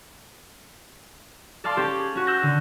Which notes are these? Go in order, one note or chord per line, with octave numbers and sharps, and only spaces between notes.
A4 D5 F5 A5 C6
C#4 G4 A4 C5
G#4
C#4 F#4
E6 F#6 G6 A#6
D3